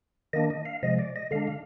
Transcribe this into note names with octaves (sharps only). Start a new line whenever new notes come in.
D#3 A#3 D4 D#5
D#5
F5
C3 F3 G#3 D#5
D5
D#5
D3 G#3 D4 F5
F5